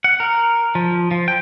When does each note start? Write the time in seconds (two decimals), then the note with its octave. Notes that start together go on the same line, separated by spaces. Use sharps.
0.04 F#5
0.20 A#4
0.75 F3
1.11 F3
1.28 G5